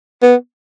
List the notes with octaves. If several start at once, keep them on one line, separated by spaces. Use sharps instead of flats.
B3